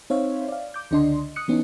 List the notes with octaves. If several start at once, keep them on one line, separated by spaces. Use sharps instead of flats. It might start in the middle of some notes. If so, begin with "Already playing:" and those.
C4 D#4 C5 C#5 E5 F5
D5 F5
D6 G6
C#2 D3 D4 D#5 C6
D#6 F#6 C#7
E3 B3 C#4 D#4